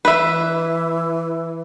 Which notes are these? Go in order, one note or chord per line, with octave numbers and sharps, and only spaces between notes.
E3 B4 E5